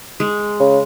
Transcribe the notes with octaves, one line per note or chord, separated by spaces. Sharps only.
G#3
C#3